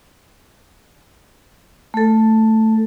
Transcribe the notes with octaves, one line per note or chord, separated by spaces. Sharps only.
A3 A4